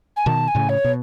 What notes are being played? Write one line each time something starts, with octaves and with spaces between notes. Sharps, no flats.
G#5
B2 D#3 A5
G#5
A2 C#3
C#5
B2